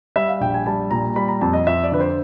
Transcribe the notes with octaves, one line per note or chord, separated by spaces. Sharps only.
G3 E5
F5
A#1 G5
G#5
G3 A5
A#2 A#5
G3 B5
A#5
F2 A5
D#5
F2 E5
D5
D3 B4
C5